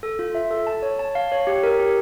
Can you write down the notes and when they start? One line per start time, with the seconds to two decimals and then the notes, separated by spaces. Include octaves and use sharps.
0.03 A4
0.19 F4
0.35 E5
0.51 A4
0.67 A5
0.83 C#5
0.99 A5
1.15 F5
1.32 C#5
1.47 G4
1.63 A#4
1.80 G4